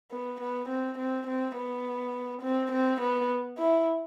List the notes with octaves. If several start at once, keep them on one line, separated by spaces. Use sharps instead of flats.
B3
B3
C4
C4
C4
B3
C4
C4
B3
E4